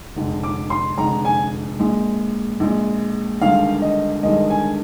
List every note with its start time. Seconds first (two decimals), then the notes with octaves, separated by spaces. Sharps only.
0.16 F1 F2 D3 G#3
0.43 D6
0.70 C6
0.98 F1 F2 D3 G#3 A#5
1.25 G#5
1.79 A#1 A#2 G#3
2.60 A#1 A#2 G#3
3.41 G1 G2 D#3 G#3 F5
3.82 D#5
4.23 G1 G2 D#3 G#3 D#5
4.50 G#5